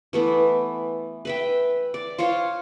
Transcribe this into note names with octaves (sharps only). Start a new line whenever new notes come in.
E3 A3 B3
B4 E5 G5
D5
F4 C5 C#5 F5